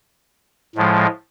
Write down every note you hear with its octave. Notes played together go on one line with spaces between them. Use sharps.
A2 F3 G#3